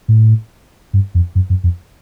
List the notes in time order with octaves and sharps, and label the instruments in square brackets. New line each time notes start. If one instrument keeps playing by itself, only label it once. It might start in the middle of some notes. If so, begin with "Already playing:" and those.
[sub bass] A2
G2
F2
F#2
F#2
F2